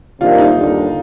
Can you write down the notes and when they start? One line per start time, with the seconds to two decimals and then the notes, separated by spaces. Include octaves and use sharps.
0.20 C3 D#3 G3 A#3 D4 F4
0.38 D#4
0.57 D#2 D3 G3 D4 G4